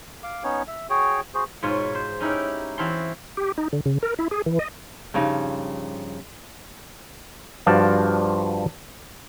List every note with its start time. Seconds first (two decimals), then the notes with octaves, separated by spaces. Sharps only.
0.23 F5 D6
0.44 B3 C#4 D#4 C#5
0.68 E5
0.90 F#4 G#4 C#5 G5
1.34 F#4 G#4 C5
1.63 G#2 B2 F4 C#5 G#5
1.95 C5
2.20 C#4 D#4 E4 G4 A#4
2.78 E3 C4 F#4 F5 A5 C6
3.37 G4
3.58 D#4
3.73 D3
3.86 C#3
4.03 A#4
4.19 E4
4.31 G#4
4.46 E3
4.59 D#5
5.14 G2 C#3 F3 D#4
7.66 G2 F3 F4 F#4 D5 A5